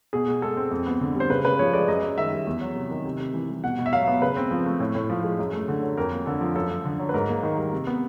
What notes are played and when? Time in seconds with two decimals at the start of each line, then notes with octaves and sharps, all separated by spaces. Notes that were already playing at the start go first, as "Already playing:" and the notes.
0.13 B2 G#4
0.28 B2
0.42 G#3 A4
0.57 C4
0.71 F2
0.86 B3
1.01 D3
1.15 G3
1.20 C5
1.30 C#3 B4
1.44 C#3 B4
1.59 F3 C#5
1.73 G#3 D5
1.88 F#2 D#5
2.03 F#2
2.18 D#3 E5
2.32 G3
2.47 E2
2.61 F#3
2.76 C3
2.91 D#3
3.05 C3
3.20 C3
3.34 E3
3.49 G3
3.64 B2 F#5
3.79 B2
3.86 E5
3.93 F#3 F5
4.07 B3
4.22 C#3 B4
4.37 C4
4.51 F3
4.66 A3
4.80 A2
4.95 A2
5.10 F3
5.24 G#3
5.39 F#2
5.53 A3
5.68 D3
5.83 F#3
5.97 F2 A#4
6.12 A#3
6.26 D3 A4
6.41 F3
6.56 F#2 A4
6.70 F#2
6.85 D3
6.99 F#3
7.09 B4
7.14 G#2 A#4
7.28 A#3
7.43 D#3
7.57 G3
7.73 C3
7.87 B3